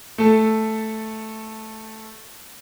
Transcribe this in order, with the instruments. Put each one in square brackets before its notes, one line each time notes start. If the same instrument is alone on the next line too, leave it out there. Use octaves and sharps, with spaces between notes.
[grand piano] A3 A4